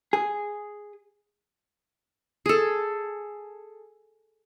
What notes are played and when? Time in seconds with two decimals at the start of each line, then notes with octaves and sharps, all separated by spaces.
0.13 G#4
2.46 G#4 A4